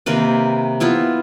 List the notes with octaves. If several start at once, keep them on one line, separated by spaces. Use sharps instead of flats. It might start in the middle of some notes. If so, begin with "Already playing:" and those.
C3 D#3 A#3 B4
B3 E4 F4 E5